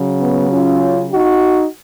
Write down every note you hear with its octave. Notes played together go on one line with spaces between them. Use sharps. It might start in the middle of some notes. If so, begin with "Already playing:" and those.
Already playing: C#3 F#3
B3
C#4 F4
D#4 F#4